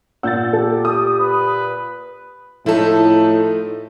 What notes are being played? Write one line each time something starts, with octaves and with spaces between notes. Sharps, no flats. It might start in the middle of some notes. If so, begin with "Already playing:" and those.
A#2 F#5 E6 G6 A6
G4 A4
D#6
B4
A2 F3 A3 D#4 E4 A4